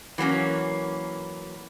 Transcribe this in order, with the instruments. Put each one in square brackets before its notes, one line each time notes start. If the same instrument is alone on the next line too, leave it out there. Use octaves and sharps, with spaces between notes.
[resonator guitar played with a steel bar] E3 F#3 A#3 C#4